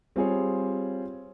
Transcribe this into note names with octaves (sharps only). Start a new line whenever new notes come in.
G3 C4 F4 G#4 C#5